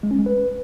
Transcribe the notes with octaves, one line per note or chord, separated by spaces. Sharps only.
G#3
C#4
G#3
B4